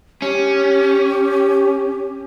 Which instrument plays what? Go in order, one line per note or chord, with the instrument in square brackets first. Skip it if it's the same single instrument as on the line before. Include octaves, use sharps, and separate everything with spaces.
[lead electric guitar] C#4 [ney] G4